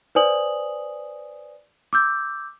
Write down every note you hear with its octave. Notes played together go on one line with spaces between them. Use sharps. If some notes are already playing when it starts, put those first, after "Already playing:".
B4 C5 D5 G#5 D#6 F#7
D6 E6 G6